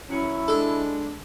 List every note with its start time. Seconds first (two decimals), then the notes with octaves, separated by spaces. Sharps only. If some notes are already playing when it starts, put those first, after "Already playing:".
0.09 F#2 F#3 C#4 E4
0.48 G#3 D4 A4